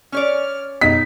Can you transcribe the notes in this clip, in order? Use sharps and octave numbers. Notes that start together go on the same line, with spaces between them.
C#4 C#5 D5 F6
F#2 B2 B3 D#4 B6